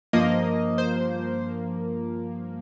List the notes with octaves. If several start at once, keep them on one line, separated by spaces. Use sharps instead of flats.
G2 F3 A#3 D#5
C5